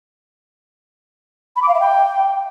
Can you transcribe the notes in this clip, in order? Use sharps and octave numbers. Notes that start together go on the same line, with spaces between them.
B5
D6
F5
E5
G5